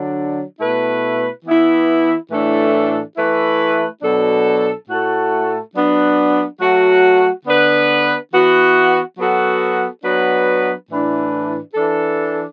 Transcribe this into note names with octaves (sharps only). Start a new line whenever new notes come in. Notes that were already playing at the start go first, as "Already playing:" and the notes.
Already playing: D3 F#3 D4
B2 A3 E4 B4
E3 B3 E4
A2 E3 A3 D4 A4
E3 A3 E4 B4
B2 F#3 D4 A4
A2 A3 F#4 A4
F#3 B3 D4
F#3 A3 F#4
D3 B3 D4 B4
E3 B3 F#4
F#3 B3 F#4 A4
F#3 B3 D4 B4
A2 E3 D4 B4
E3 D4 A4